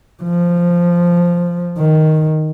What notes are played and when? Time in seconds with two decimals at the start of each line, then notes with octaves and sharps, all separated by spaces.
0.23 F3
1.79 D#3